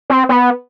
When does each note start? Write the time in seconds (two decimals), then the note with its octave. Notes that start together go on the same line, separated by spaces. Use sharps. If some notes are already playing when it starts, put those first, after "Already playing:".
0.10 C4
0.29 B3